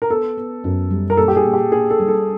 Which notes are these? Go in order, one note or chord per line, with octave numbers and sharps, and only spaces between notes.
A#4
B3 A4
B3
F#2
G3
A#4
A#2 A4
G4
G#4
A#2
G4
A#3 G#4
A4
G3
A4